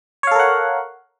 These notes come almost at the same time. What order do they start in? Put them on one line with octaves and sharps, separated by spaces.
C#5 F5 A4 A#4 F#5